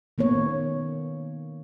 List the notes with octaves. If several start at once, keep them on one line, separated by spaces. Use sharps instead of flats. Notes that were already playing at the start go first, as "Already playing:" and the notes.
D#3 A#3 B3 C#5